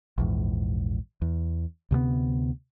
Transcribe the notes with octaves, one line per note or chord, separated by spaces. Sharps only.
A#1 E2 G#2
E2
D2 C3 G#3 B3